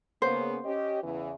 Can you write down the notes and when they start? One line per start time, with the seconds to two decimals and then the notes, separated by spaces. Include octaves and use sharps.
0.22 C#3 A#3 B3 C5
0.65 C#4 G4 D#5
1.03 E2 C#3 E3